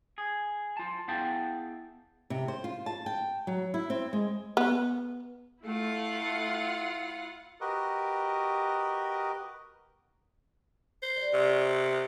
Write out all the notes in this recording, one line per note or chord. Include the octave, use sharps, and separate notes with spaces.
G#4
F4 A5
B3 E4 G#4 F5 G5 A5
C3
C5
F4
A5
G5
F#3
E4
C4
G#3
B3
A3 E4 F4 F#5
F#4 G4 A#4 B4 D#5
C5
G3
C3
B3